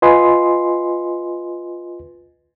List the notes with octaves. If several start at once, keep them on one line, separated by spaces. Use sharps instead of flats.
F4 B4 D#5 G#5 C6